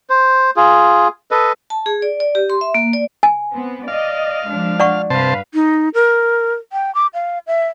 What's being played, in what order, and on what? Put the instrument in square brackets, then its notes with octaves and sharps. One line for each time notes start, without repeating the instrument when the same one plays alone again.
[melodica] C5
F4 G#4
A4 B4 D#5
[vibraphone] A5
G#4
D5
D5
G4
C6
E5
A#3
D5
[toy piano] G#5
[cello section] B3 C4
[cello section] D5 D#5 [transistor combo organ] F5
[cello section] F3 G#3 D4
[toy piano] D5 F#5 C#6
[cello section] G2 B4 F5 [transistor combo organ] C3 C5 A5
[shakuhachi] D#4
A#4
G5
D6
F5
E5